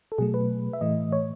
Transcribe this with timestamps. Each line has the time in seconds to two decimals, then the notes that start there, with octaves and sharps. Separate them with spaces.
0.12 A4
0.18 B2 F#3 A3 G#4
0.34 B4
0.73 E5
0.81 A2 E3 A3 D#5
1.12 C#5